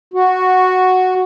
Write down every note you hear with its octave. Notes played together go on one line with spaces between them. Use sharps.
F#4